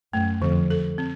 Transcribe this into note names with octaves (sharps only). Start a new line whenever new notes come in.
F#2 A3
F2 D3
A4
C4